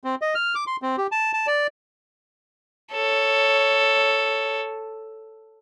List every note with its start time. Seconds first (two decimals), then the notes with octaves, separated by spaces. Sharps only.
0.04 C4
0.22 D#5
0.35 F6
0.55 D6
0.67 C6
0.82 C4
0.98 G4
1.12 A5
1.33 A5
1.47 D5
2.93 A4 C#5